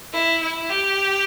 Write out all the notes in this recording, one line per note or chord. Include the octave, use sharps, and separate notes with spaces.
E4
E4
G4